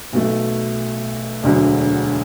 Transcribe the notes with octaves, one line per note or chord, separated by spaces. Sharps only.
B1 B2 A3
E1 D2 D3 F#3